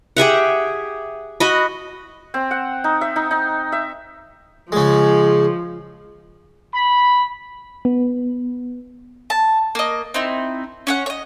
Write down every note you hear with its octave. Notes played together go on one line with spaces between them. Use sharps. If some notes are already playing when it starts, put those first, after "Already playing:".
G4 G#4 E5 F#5
F#4 D#5 B5
C4
F#5
D#4
E5
D#4
D#4
E5
C#3 F3 G#3
B5
B3
A5
A#3 D#5
C4 D#4 E4
C#4 C#5 F#5
C#5 D#5